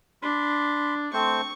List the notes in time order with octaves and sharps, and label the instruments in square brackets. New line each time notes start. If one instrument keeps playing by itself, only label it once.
[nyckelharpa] D4 [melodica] B5 C6
[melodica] A3 C4 C5 [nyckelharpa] C#6